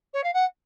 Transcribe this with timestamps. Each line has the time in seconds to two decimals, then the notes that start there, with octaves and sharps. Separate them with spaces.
0.14 C#5
0.24 F5
0.34 F#5